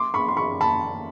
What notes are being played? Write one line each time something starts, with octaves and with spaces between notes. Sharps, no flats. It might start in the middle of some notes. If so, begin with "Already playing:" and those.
Already playing: C6 D6
B5 C#6
C6
B5 C#6
A5 B5